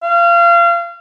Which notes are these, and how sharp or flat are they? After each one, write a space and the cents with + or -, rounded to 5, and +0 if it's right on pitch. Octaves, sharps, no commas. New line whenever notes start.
F5 -30